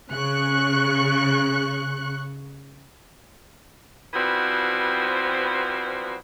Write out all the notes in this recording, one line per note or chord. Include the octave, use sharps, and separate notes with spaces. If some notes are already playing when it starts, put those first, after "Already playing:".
C#3 C#6 F#6
E3 F3 G3 B3 C4 F#4